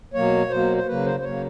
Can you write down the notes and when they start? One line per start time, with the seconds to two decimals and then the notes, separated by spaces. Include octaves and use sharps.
0.14 B2 F#3 A#3 C#5
0.50 B2 F#3 A#3 C5
0.77 C5
0.87 C#3 F#3 A#3 B4
1.05 C5
1.20 C5
1.23 C#3 F#3 A#3 C#5